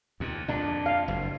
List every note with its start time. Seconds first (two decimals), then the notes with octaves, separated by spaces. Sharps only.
0.20 D#2 A#2
0.48 F2 A#2 D4
0.86 F5
1.08 F#1